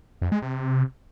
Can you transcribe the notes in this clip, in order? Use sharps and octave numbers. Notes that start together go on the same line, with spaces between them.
F2
G#3
C3